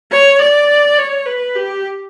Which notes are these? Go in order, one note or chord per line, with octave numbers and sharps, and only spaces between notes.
C#5
D5
C#5
B4
G4